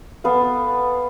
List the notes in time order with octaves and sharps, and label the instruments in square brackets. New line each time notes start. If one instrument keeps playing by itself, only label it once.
[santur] B3 A4 F5